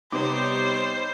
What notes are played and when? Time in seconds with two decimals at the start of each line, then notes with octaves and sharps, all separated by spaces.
0.12 C3 G3 B3 D#4 C5 C#5 D6